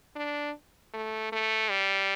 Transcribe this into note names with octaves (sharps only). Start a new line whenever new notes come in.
D4
A3
A3
G3